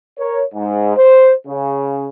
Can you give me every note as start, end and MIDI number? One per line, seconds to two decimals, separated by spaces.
0.19 0.43 70
0.19 0.43 73
0.54 0.95 44
0.97 1.33 72
1.47 2.09 49